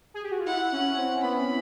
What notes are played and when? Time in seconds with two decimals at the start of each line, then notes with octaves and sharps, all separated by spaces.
0.14 G#4
0.23 G4
0.31 F#4
0.39 F4
0.46 E4 F#5
0.72 C#4
0.97 C4
1.22 B3 B5